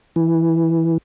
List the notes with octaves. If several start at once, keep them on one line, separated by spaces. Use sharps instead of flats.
E3